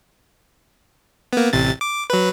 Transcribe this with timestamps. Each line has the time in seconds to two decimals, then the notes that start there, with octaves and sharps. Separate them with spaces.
1.33 A#3 B3
1.53 A1 C3 A6
1.81 D6
2.10 F#3 B4